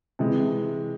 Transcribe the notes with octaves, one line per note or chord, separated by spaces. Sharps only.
C3 E3 G#3